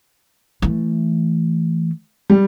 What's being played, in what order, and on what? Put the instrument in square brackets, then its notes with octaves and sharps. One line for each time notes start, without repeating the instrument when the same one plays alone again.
[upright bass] E3 A3
[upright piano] G3